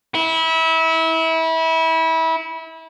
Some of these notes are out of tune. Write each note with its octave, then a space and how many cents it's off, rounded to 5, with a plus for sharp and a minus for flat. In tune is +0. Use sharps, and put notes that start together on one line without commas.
E4 -25